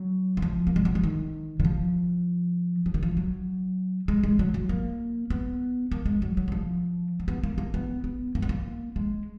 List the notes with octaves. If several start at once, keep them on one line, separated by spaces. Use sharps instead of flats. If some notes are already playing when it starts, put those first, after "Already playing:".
Already playing: F#3
D#3
F3
A#3
G#3
F#3
F3
D#3
D#3
F3
F3
D#3
F3
F#3
G#3
G#3
F#3
F#3
A#3
B3
A#3
G#3
F#3
F#3
D#3
F3
A#3
B3
A#3
A#3
B3
B3
A#3
B3
A#3
G#3